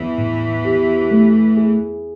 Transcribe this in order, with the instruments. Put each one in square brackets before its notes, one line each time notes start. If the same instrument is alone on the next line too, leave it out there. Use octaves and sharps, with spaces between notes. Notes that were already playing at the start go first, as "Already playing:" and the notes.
Already playing: [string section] E2 E3
[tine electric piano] A2
G4
A3
G#4